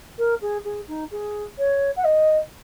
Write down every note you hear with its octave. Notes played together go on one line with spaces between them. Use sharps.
A#4
G#4
G#4
D#4
G#4
C#5
F#5
D#5